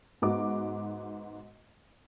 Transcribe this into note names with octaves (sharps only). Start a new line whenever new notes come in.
G#2 B3 F#4 D6